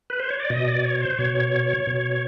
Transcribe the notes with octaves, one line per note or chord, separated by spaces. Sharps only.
B4
C5
C#5
D5
B2 D#5
D5
C#5
C5
B2 C#5
B2